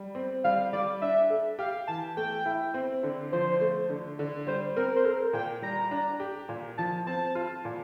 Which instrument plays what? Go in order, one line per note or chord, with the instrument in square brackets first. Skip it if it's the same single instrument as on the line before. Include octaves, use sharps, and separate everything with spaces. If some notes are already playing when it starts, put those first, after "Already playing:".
Already playing: [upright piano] G3
C4
[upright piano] G3 [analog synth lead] F5
[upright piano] G3 [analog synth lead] D5
[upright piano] D4 [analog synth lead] E5
[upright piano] A4
[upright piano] G4 [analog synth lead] F5
[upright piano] E3 [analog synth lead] A5
[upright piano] A3 [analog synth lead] G5
[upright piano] E4
C4
D3
[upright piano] F3 [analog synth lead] C5
[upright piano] A3
D3
D3
[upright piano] G3 [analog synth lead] C5
[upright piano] C4 [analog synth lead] A#4
[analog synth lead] C5
[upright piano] A4 [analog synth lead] A#4
[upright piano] A#2 [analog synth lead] G5
[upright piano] G3 [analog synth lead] A#5
[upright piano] D4
G4
A#2
[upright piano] F3 [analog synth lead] A5
[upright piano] C4 [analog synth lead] A5
[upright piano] F4
A#2